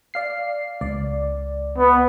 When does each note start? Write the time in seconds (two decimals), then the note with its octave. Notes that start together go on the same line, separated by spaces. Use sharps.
0.14 D5 F5 C7
0.81 C#2 D5
1.78 B3